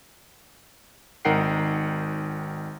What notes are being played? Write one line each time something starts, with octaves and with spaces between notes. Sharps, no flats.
G#1 D#4 A#4 F#5 G5 C7